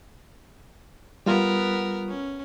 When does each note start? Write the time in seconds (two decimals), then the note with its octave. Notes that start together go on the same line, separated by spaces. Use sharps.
1.26 G3 B3 F4 A#4
2.08 C#4